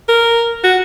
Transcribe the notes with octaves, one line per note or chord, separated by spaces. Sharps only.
A#4
F#4